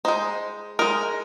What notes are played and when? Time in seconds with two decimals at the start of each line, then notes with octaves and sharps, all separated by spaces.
0.05 G#3 D#4 C5
0.79 G#3 D#4 A#4